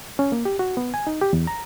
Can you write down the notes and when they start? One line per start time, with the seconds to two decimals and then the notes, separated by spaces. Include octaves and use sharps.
0.19 C#4
0.32 A#3
0.45 G4
0.59 F#4
0.77 B3
0.94 G#5
1.07 D#4
1.22 G4
1.33 E2
1.47 A#5